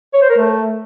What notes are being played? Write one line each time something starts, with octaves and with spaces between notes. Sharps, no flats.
C#5
C5
A#4
A3